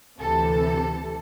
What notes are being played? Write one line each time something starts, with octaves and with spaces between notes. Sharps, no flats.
D2 C3 E3 A4